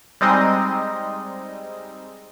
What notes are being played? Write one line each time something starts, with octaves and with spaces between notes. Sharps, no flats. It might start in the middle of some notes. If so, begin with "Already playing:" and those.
G3 G#3 C4 D#4 D#5